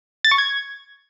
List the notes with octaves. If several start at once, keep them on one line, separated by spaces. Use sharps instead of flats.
A6
C#6
G#6